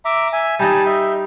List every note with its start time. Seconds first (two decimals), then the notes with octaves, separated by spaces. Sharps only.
0.05 E5 A#5 D6
0.33 E5 G#5
0.60 G3 D#4 G#5 A5
0.86 D#5 E5